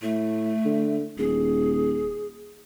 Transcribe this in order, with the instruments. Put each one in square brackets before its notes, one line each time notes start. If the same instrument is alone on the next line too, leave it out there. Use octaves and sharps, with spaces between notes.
[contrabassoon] A2 [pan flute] A3
[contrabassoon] D3
[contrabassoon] D#1 [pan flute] G#4